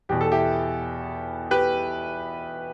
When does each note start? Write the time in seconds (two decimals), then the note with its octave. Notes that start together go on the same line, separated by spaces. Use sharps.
0.09 E2 B2 G4
0.21 A4
0.32 E4 G4
1.51 G4 B4